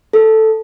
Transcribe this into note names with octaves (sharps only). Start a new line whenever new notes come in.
A4